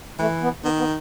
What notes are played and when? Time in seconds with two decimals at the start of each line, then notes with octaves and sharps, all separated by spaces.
0.19 E3 A3
0.42 B3
0.63 D#3 B3
0.79 B3